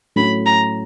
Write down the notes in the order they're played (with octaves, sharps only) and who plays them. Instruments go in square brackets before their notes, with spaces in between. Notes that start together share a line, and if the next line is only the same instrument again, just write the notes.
[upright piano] A2 F#3 A3 C#4 F#4 [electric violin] B5
[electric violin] A#5